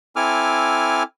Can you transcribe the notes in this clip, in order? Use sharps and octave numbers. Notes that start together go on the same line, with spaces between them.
C4 E4 A4 G#5 D6 F6